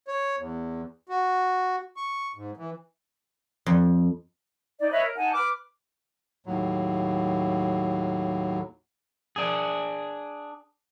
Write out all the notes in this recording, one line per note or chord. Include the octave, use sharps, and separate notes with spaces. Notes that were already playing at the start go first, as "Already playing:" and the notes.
C#5
E2
F#4
C#6
G#2
E3
F2
D#4 D5
B4 C#5 D#5 E5
A#4
D#4 F#5 G#5 A5
B4 D6 F6
D#2 A2 F#3
D4 G#4